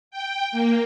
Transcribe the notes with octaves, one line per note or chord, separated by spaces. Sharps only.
G5
A#3